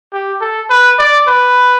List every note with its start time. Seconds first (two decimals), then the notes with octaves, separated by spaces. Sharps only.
0.13 G4
0.41 A4
0.71 B4
0.99 D5
1.28 B4